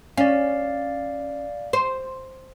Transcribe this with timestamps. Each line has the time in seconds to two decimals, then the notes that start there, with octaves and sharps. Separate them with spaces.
0.17 C#4 D5 F5
1.73 C5